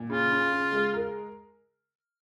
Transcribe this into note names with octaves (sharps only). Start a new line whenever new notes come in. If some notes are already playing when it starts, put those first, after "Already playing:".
Already playing: A#2
C#3 F4
C#3
C#3
G#3
A#4